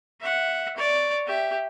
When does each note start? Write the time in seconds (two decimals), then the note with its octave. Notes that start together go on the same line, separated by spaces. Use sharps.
0.21 E5 F#5
0.77 C#5 D5
1.26 G4 E5